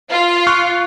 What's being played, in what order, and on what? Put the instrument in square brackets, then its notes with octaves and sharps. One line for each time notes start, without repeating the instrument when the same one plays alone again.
[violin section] F4
[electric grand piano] C#6 F6 F#6